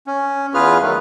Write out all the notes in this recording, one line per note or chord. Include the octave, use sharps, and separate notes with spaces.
C#4
E2 F4 G#4 B4 F6
D#3 F#3 A3